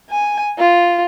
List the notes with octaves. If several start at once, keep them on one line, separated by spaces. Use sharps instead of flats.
G#5
F4